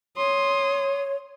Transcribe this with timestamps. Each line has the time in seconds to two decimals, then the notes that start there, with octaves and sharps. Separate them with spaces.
0.17 C#5 C6 D#6